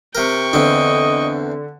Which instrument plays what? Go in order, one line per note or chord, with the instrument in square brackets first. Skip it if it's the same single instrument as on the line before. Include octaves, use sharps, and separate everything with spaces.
[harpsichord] C3 A#4 [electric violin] G5 C#6
[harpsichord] E2 C4 [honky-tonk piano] D3 [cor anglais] D#5